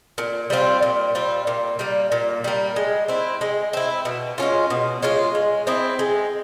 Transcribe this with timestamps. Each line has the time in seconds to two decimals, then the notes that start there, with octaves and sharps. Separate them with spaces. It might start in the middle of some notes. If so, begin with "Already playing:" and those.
0.18 A#2
0.50 G3 C4 F4
0.82 A#2
1.15 G3 C4 F4
1.47 A#2
1.79 G3 A#3
2.12 A#2
2.44 G3 A#3
2.76 G#3
3.08 C4 E4
3.41 G#3
3.73 C4 E4
4.05 B2
4.38 G#3 C#4 F4
4.70 B2
5.03 G#3 C#4 F4
5.35 G#3
5.67 C4 E4 G#4
5.99 G#3